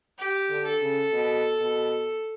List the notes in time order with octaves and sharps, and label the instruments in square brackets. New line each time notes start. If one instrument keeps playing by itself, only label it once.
[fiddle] G4
[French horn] D3
[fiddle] A4
[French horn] C#3
B2
B2